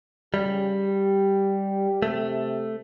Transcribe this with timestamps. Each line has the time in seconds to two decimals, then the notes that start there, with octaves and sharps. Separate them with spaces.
0.34 C#3 G3 G4
0.87 G4
2.02 C3 A3